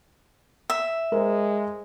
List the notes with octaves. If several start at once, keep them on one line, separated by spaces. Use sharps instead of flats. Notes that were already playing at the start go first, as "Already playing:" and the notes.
E5
G#3 A#4 C5